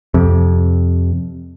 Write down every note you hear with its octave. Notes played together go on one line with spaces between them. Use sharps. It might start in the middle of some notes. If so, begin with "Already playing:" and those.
F2 C3